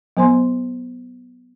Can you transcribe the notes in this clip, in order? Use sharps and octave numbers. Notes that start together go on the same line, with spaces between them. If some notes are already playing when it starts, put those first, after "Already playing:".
F#3 B3 C5 G#5 C6